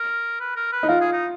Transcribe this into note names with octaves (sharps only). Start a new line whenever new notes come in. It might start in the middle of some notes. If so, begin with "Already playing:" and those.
Already playing: A#4
B4
A#4
B4
D#4
F4 A#4
G#4
D#4